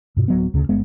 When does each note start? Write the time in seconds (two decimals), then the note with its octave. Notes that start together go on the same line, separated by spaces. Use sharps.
0.17 G2 B2
0.28 D1 F#3 B3
0.54 D2 C#3
0.69 G1 G#3 B3